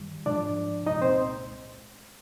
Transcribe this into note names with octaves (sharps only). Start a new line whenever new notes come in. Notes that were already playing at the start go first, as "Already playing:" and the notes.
Already playing: G2 D#3 G3
G#2 F3 G#3 D4 D5
C2 A#2 G#3 D#4 D#5
C4 C5